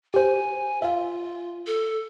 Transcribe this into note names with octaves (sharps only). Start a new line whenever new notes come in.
G4 C5 G#5
F4 E5 F5
A4